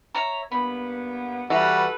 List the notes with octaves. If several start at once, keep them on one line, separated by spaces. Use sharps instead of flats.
C#5 E5 A#5
G2 A#3 B3 B5
E3 G3 F#4 A4 B4 A#5